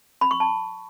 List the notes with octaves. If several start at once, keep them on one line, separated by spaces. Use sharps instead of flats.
B5
C#6
A5